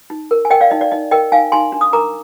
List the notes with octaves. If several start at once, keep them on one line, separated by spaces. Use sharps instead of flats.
D#4
A#4
G#5
A#4 D#5 G5
D5 F5
D#4 D#5
D5
D#4 D#5
A#4 D#5 G5
D#4 F5 G#5
D#4 G#5 C6
D4
D#6
A#4 A#5 D6